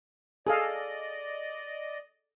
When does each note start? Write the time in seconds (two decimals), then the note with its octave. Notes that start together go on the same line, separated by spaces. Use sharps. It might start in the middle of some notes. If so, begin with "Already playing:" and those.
0.47 G#4 A4 D5 D#5 F5